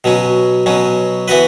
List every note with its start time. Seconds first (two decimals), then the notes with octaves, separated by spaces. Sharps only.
0.04 B2 F#3 C#4
0.66 B2 F#3 C#4
1.28 E3 B3 F#4 B4